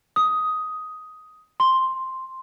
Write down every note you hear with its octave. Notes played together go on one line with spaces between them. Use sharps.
D#6
C6